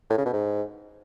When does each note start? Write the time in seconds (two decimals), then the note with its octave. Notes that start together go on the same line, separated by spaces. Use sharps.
0.10 A2
0.18 C#3
0.26 B2
0.33 G#2